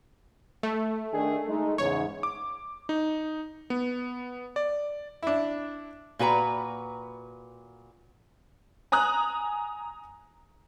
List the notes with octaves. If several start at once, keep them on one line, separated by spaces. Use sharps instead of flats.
A3
D#3 D4 G#4
G#3 D#4
E2 G#2 C#3 C#5
D6
D#4
B3
D5
D4 E4
A#2 F#4 B4 A#5
G#5 A#5 D#6 F#6